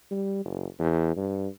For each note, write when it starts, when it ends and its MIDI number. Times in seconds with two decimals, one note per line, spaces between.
0.11 0.44 55
0.45 0.66 30
0.79 1.15 40
1.17 1.48 43